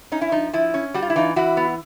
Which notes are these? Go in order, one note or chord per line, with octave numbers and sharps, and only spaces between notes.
C#4 D#4
E4
F3 D#4
F3 E4
C#4
G3 F#4
F4
E4
E3 D#4 F4
E3 E4 F#4
B3